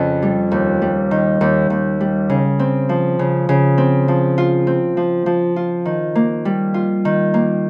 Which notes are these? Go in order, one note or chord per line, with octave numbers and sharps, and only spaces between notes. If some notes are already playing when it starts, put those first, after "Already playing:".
Already playing: F2 C#3 C#4
G3
D#2
G3
D#3
D#2
D#2
G3
C#3
C4
F3
C#3
C#3
C4
F3
F4
C4
F3
F3
F4
D#3
A#3
G3
F4
D#3
A#3